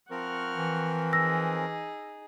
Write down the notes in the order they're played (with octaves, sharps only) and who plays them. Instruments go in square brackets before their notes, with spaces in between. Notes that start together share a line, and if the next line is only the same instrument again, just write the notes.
[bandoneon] F3 C4 A#4 [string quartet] F#5 C#6 F6
[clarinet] E3
[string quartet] D#4 G#4 [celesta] E6 A#6